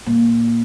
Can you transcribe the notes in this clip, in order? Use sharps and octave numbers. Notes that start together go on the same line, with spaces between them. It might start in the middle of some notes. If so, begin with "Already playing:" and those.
A#2